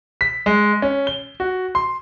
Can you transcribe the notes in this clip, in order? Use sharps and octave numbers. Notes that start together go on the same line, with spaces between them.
B6
G#3
C#4
G7
F#4
C6